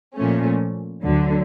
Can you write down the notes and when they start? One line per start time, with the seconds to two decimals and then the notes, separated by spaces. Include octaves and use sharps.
0.15 A#2 F3 A3 C#4
1.02 D2 D3 F#3